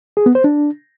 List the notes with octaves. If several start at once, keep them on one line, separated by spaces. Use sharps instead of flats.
G#4
B3
C5
D4